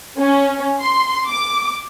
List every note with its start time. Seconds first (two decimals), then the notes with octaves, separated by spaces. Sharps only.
0.19 C#4
0.82 C6
1.28 D6